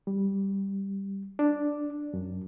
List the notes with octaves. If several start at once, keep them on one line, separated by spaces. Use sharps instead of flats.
G3
D4
F#2